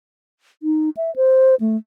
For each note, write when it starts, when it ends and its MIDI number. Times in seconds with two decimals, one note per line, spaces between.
0.63 0.90 63
0.97 1.14 76
1.16 1.55 72
1.60 1.77 57